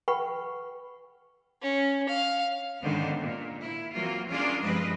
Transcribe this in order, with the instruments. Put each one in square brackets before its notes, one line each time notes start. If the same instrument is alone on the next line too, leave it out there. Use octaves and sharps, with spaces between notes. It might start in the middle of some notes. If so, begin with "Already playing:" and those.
[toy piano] B4 F#5 G5 B5 C#6
[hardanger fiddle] C#4
F5
[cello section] G#2 D3 D#3 B3 C#4 C5
A#2
E4
E3 F#3 A#3 C4 F4
C#4 D4 F4 G#4 A#4 D5
G2 F3 G#3 C4 B4 D#5